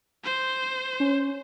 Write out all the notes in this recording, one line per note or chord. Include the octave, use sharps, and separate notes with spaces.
C5
C#4